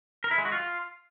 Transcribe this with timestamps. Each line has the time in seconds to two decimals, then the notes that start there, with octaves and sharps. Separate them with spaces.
0.24 A#4
0.31 E4
0.38 G#3
0.45 F#4
0.52 F4